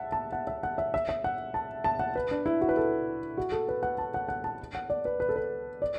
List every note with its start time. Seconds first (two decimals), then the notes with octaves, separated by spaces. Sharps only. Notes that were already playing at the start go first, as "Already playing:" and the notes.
Already playing: E5 F#5 A5
0.12 A5
0.32 F#5
0.47 E5
0.63 F#5
0.78 E5
0.94 E5
1.09 E5
1.24 F#5
1.54 A5
1.84 A5
1.99 F#5
2.16 B4
2.31 D4
2.46 E4
2.61 F#4
2.69 B4
2.77 A4
3.38 F#4
3.52 A4
3.69 B4
3.83 F#5
3.98 A5
4.14 F#5
4.29 F#5
4.44 A5
4.75 F#5
4.90 D5
5.05 B4
5.20 B4
5.29 A4
5.36 B4
5.82 D5